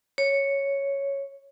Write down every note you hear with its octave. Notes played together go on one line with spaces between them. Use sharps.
C#5